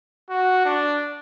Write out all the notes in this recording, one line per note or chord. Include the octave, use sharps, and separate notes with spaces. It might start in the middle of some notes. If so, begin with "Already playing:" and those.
F#4
D4